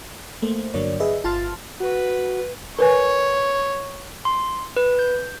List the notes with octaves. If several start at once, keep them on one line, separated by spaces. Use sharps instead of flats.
A3 A#3 C5
G2 D3 F#3 A#3 C#5 D5
G#4 B4 D#5 E5
G1 F4 A5 C6 F6 A6
F#4 B4
A#4 B4 C#5 G#5
C6
B4
G6